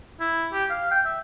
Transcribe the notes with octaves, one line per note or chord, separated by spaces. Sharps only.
E4
G4
F5
G5
E5